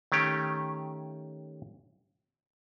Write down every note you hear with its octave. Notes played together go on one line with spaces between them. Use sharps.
D#3 A3 C#4 G4